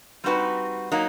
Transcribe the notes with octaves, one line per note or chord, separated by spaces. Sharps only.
G3 C4 D#4 F#4 B4
F#3 A#3 D#4